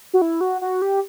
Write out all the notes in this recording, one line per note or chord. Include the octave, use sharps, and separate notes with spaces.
F#4
E4
F#4
F#4
G4